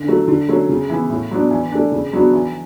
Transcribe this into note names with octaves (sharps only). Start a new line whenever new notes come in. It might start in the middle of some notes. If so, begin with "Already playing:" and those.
Already playing: D3
F#3 A3
D3
F#3 A3 C#4
C#3
E3 B3 E4
A2
F#3 B3 D4
E3
A3 D4
C#3
F#3 B3 D4 F#4
E3